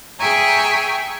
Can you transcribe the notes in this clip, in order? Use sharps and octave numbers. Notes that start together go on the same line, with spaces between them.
G#4 E5 G5 G#5 A#5 C#6